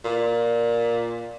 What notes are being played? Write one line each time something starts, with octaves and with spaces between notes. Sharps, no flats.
A#2